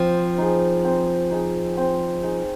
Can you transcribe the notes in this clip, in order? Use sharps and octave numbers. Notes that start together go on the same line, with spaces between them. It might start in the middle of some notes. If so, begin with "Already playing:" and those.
Already playing: F3 C4
D#4 G#4
C4
D#4 G#4
C4
D#4 G#4